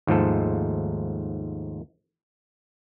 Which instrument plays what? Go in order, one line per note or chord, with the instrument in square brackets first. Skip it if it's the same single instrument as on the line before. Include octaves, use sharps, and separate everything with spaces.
[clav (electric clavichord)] D#2 G#2 F3 A3 A4